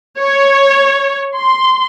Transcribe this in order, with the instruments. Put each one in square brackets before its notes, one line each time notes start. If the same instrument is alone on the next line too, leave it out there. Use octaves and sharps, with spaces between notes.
[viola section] C#5
C6